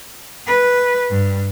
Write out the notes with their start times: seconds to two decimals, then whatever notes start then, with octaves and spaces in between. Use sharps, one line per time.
0.46 B4
1.10 G2